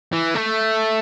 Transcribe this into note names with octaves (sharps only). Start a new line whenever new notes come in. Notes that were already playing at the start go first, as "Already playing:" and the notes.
E3
A3